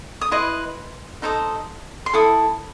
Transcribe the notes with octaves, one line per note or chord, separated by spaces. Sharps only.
D#6
E4 B4 D#5 C6
D#4 A4 C5 D#5
C6
E4 A4 D#6